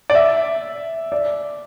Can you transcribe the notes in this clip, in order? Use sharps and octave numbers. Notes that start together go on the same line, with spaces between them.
D5
E5
D5